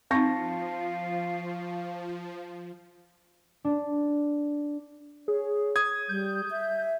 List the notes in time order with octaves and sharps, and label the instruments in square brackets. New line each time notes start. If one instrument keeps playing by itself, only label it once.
[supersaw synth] F3 [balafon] C4 D#4 [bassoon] F4 [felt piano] A5 C#6 A#6
[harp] D4
[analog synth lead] G#4 [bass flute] C#5
[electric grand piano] D#6 G#6
[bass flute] G3 [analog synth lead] G6
[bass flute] E5